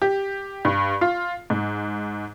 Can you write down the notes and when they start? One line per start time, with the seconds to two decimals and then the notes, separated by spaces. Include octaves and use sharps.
0.02 G4
0.65 G2
1.01 F4
1.50 G#2